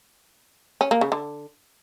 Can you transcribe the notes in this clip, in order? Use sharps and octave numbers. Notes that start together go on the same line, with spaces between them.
C#4
A#3
C#3
D3